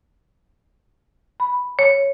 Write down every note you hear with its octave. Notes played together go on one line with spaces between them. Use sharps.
B5
C#5